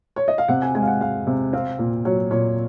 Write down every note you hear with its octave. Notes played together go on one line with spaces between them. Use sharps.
C#5
D#5
F5
C3 F#5
G#5
G#3 G#5
F5
F#5
G#3 F5
C3
C4 F5
A#2
F#3 C#5
A#2 C#5